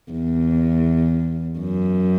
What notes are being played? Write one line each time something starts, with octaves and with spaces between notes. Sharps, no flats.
E2
F#2